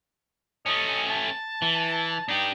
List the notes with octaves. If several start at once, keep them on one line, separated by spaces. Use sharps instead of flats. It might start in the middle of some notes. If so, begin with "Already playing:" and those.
A3 C#4 D#5
A5
E3
D4 D#4 G4